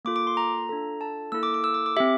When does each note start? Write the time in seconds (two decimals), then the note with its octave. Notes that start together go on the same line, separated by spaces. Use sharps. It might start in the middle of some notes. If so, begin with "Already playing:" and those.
0.05 A#3 F4 A4 D6
0.16 D6
0.27 C6
0.37 A#5
0.69 D4 F4 A4
1.01 A5
1.32 A#3 E4 A4 E6
1.43 D6
1.54 D6
1.64 E6
1.74 D6
1.86 D6
1.96 C4 G4 E5